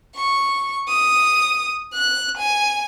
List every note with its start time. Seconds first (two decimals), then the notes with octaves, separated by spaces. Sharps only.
0.16 C#6
0.88 D#6
1.94 F#6
2.38 G#5